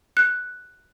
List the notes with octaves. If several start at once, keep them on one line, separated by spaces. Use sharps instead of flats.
F#6